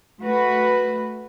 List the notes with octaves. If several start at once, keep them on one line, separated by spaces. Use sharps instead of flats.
A3 F#4 B4